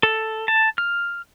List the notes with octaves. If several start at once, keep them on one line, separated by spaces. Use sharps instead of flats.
A4
A5
F6